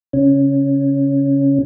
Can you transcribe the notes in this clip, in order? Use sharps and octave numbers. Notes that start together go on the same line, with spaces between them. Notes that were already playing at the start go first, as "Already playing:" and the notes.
C#3 C#4